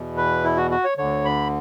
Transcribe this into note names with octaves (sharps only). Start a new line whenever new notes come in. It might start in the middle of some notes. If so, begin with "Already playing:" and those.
Already playing: E2 B2
B4
E4
F#4
F#4
C#5
D2 D3 C#5
B5